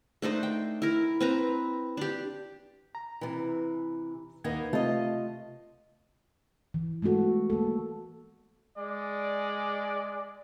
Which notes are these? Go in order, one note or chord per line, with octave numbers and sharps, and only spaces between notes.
A3 D4 D#4 C5
G5
E4 A#4
C4 B4 A#5
D4 G4
A#5
C3 E3
D#2 A#3 B3 D#4 G#6
C3 A3 F4 D#5 A5
E3
G#3 A3 B3 F#4 A4
A#3 A4
G#3 D5